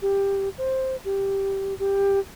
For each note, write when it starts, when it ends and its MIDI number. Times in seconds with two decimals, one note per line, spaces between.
0.02 0.49 67
0.58 0.96 72
1.05 1.74 67
1.79 2.19 67